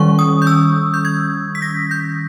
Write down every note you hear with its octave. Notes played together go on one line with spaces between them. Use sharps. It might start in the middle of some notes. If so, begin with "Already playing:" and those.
Already playing: D#3 G3 C#4 C#6
D#6
G6
E6
G6
G#6
B6
A#6
G6